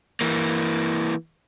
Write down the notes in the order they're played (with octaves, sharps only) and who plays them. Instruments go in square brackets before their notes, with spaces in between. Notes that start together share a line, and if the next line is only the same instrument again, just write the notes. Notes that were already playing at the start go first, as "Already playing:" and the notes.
[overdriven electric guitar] E3 A#3